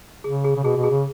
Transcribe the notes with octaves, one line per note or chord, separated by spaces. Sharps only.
C#3 G#4
G#4
C#3
B2 G#4
B2
G#4
C#3